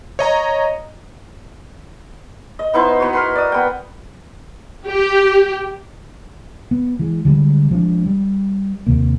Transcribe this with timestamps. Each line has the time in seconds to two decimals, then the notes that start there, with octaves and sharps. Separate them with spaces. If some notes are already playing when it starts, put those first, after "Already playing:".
0.19 C#5 D#5 A#5
2.59 D#5
2.74 B3 D#4 E4 C5
3.00 B3 F#4
3.13 A#4 B4 C6
3.36 D5 D#6
3.52 B3 G5
4.86 G4
6.71 B3
6.99 E3 G#3
7.25 D3 D#3 G3 G#3
7.71 F3 G#3 D4
8.06 G3
8.87 D#2 C3 A#3